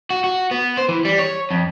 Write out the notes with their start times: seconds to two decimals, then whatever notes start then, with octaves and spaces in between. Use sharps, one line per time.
0.10 F#4
0.24 F#4
0.51 B3
0.77 C5
0.89 E3
1.05 G3
1.19 C#5
1.51 F2